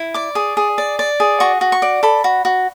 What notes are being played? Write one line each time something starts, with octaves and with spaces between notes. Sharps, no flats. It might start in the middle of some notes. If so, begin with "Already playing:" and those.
Already playing: E4
D5 D6
G#4
G#4
D5
D5
G#4
F#4 C#6
F#4
C#6
D5
A4 B5
F#4
F#4